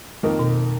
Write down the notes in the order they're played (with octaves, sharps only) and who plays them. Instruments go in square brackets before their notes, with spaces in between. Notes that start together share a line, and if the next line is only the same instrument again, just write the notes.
[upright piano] F2 D#3 A#3 D#4 A#4
[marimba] B2